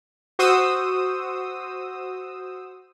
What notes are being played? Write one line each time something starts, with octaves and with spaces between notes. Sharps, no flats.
F#4 C5 D#6 E6